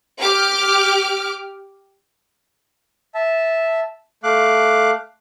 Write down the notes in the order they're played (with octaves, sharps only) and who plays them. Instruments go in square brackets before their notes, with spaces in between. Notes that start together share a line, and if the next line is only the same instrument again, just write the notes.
[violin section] G4 D6 F6
[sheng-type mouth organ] E5 A5
A3 F5 D6 F#6